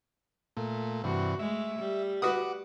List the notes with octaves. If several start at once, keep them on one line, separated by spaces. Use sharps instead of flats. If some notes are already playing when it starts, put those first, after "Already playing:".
A#2 A3
G2 C3 E3 F#4
G#3 A3 E5
G3
F#4 B4 F#5 D6 D#6